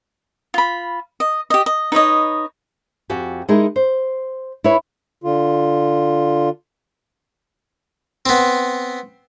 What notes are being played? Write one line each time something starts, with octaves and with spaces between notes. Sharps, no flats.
F4 B5
D#5
G4 D#5
D#5
D#4 B4 C#5 D#5
F2 F#4 G4 G#5
G#3 D#4 E4 G#4 A#4
C5
E4 B4 C#5
D3 F4
B3 C4